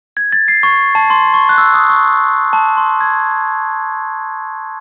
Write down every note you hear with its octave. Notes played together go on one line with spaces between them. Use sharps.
G#6
A6
C7
C#6
A5
C6
C#6
F#6
E6
D#6
C#6
A5
C6
G#6